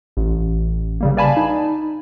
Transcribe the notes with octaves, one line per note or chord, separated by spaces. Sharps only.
A1
C#3 G3 A#3
B4 D5 F5 G#5 A5 B5
D#4